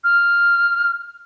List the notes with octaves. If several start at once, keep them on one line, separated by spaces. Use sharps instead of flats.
F6